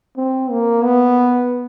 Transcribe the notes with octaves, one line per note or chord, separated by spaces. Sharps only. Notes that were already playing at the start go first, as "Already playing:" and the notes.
C4
A#3
B3